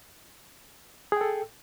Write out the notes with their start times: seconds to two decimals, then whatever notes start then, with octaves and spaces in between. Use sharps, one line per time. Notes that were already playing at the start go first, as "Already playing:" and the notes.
1.12 G#4
1.17 G5
1.21 A4